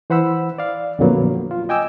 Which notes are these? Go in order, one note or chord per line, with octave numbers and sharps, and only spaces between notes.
E3 C5 F#5 B5 E6
D5 F5
F2 A#2 D3 F#3 A#3 B3
F4
D#5 G5 G#5 D6 E6